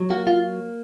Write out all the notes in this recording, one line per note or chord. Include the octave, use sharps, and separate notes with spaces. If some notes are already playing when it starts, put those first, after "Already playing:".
Already playing: F#3
A#3 F#4
F4